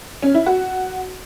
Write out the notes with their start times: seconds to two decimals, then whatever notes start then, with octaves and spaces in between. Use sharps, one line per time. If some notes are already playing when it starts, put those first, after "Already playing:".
0.23 C#4
0.34 E4
0.46 F#4